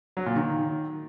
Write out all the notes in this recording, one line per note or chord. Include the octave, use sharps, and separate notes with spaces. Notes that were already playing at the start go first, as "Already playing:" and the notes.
F#3
A#2
D#3